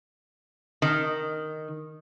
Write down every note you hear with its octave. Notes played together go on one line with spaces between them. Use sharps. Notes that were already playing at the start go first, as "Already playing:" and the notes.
D#3